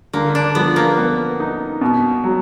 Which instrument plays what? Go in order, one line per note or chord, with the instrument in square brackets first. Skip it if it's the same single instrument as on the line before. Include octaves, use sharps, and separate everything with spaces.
[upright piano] D3 [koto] A#3
[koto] D4
[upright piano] F3 [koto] B3
[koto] A#3
[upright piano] B3
D#4
B2
F#3